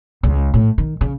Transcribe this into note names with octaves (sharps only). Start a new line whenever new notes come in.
C#2
A2
D#3
C#3